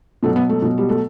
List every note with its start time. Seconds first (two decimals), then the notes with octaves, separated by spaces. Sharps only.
0.23 B2 F#3 A3
0.36 B3
0.49 A3
0.62 B2 F#3
0.78 G3
0.89 A3